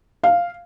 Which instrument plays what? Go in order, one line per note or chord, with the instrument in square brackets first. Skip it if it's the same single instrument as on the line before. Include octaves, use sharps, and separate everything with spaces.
[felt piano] F5